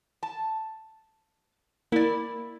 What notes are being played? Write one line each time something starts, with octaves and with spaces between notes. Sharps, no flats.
A5
A#3 E4 D5